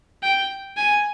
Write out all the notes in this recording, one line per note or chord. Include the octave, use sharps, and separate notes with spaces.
G5
G#5